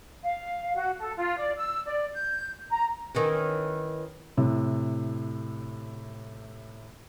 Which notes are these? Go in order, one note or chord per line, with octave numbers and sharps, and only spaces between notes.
F5
F#4
A4
F4
D5
E6
D5
G6
A#5
D#3 E3 C#4
A2 C3